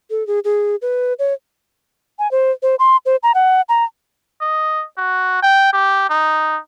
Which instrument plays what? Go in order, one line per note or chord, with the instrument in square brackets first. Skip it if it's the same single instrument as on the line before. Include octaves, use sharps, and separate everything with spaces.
[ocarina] A4
G#4
G#4
B4
C#5
G#5
C5
C5
C6
C5
A#5
F#5
A#5
[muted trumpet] D#5
F#4
G5
G4
D#4